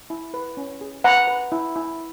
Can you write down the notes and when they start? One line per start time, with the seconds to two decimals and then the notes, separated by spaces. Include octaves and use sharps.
0.10 E4
0.34 B4
0.57 C#4
0.81 G#4
1.04 B4 F#5 A#5
1.28 B4
1.52 E4
1.76 E4